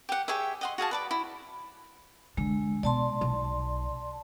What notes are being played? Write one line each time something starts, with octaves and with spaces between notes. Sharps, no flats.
G4 F#5
G4 G#4 C#5 E5
D#5 F#5 C6
F#4 G#4 F5 A5
B4 D5 D6
E4
D3 G#3
B2 D5 A5 C6
B1